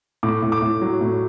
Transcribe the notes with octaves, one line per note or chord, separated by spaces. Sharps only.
A2 D6
A2
D6
A2
F#3
A2